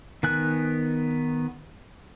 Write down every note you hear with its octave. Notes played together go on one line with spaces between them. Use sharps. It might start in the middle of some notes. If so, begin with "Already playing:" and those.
D#3 B3 G#5 F#6